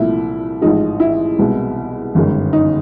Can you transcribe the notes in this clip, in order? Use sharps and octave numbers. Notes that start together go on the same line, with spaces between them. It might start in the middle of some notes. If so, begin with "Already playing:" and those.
Already playing: C2 A#2 F3 A3 E4
A1 G#2 F3 G#3 D#4
E4
C2 B2 G#3
G1 F#2 D#3 G#3
D#4